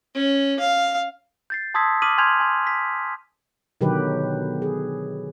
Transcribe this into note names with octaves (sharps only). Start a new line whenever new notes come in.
C#4
F5
G6 A6 C7
A5 C6 D#6 E6 G#6 B6
D6 D#6 F6 B6 D#7 F#7
G#5 C6 F6 G6 G#6 F7
G#5 C6
B6
B2 D3 D#3 F#3 G4 B4
G#4